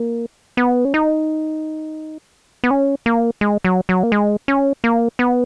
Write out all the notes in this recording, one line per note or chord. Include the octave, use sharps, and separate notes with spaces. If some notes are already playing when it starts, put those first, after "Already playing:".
Already playing: A#3
B3
C#4
D#4
B3
C#4
A#3
G#3
F#3
F#3
A#3
G#3
C#4
A#3
B3